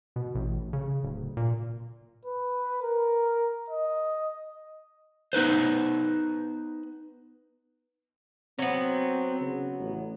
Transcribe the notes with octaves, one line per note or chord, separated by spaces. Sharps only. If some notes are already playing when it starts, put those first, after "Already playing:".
B2
A1
C#3
D1
A#2
B4
A#4
D#5
B3 D#4 B4 C5
F#3 B3 C4
C#3
A1